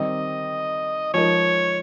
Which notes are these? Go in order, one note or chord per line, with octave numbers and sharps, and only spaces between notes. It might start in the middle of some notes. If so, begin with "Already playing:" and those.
Already playing: D#3 G3 C4 D#4 D#5
F3 G#3 D#4 A#4 C#5